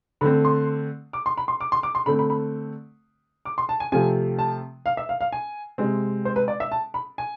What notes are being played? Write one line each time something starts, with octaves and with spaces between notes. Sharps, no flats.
D3 A3 C4 B5
C6
D6
C6
B5
C6
D6
C6
D6
C6
D3 A3 C4 B5
B5
B5
D6
C6
A5
G#5
C3 F3 A3 C4 G#5
A5
F5
E5
F5
F5
G#5
C3 G#3 C4
C5
B4
D5
E5
A5
B5
G#5